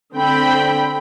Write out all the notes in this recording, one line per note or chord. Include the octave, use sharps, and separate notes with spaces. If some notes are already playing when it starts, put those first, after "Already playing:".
D3 C4 G5 B5